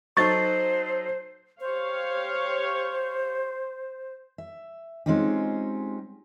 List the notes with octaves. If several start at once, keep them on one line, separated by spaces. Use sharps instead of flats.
F#3 D#4 A4 C5 C#6 A6
G4 C5 C#5 F5
E5
G#3 C4 C#4 D#4 F4 G4